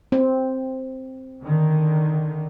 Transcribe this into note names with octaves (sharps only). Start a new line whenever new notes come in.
C4
D3 D#3